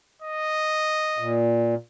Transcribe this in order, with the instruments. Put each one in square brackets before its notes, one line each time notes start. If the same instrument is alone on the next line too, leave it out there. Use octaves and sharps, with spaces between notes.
[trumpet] D#5
[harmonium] A#2